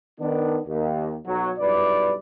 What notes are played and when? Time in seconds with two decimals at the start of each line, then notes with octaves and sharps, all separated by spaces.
0.20 D#3 B3 D4
0.67 D#2
1.27 B1 F#3
1.59 B1 G2 E4 B4 D5